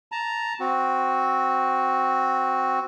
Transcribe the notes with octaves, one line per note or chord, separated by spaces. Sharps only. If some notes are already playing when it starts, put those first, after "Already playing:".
A5 A#5
C4 F#4